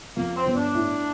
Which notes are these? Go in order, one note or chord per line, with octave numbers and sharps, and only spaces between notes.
F2 A#3
C4
G1
D4
A2